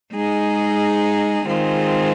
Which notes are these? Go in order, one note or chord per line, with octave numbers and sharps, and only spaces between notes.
G#3 D#4 G#4
D#3 G#3 C4 F4 G#4